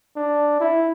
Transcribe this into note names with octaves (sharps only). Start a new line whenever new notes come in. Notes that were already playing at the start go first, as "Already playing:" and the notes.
D4
E4